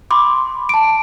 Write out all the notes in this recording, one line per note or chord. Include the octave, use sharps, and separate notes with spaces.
B5 C6 D6
A5 D7